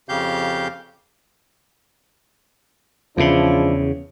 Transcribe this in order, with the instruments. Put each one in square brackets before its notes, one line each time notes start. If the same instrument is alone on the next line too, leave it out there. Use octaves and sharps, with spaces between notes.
[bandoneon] F2 C#3 G4 F5 G6
[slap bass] E2 C#3 [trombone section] F3 D4 E4